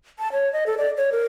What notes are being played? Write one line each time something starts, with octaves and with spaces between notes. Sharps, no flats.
A5
C#5
D#5
A4
D5
C#5
A#4